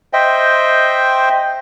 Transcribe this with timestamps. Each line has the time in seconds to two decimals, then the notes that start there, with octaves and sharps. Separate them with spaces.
0.13 C5 D#5 E5 G5